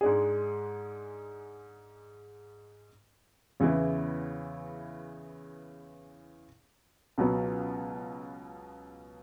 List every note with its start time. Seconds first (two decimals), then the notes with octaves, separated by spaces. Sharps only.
0.01 G#2 G#3 D4 G#4
3.60 E2 C#3 E3 B3 E4
7.18 C#2 B2 F#3 B3